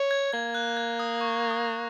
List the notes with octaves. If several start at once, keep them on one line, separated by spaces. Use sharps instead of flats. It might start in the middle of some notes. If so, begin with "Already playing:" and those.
Already playing: C#5
G#6
A#3 G#6
F#6
G#6
D#6
C#6
D#6